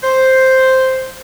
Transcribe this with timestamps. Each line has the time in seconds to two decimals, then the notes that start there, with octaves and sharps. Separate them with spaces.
0.03 C5